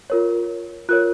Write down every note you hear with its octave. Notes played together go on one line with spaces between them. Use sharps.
F4 A#4 C#5
F4 A#4 C#5 F#6